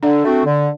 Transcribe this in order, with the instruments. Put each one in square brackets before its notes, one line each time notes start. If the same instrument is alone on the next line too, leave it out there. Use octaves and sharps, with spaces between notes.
[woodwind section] D3 [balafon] D4
[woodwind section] A3 C4 F#4
D3